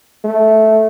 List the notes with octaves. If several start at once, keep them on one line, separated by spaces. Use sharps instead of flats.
A3